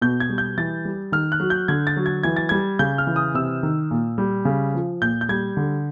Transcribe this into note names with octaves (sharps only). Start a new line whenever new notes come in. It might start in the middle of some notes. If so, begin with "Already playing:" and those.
B2 G6
G#6
G3
G6
E3 A6
G3
D#3 F6
F#6
F#3
G6
D3 G#6
A6
F#3
G#6
E3 G#6
A6
G3 G#6
C#3 G6
F6
E3
D#6
C3 E6
D#3
A#2
G3
C#3
F3
A#2 G6
G6
G3 G#6
D3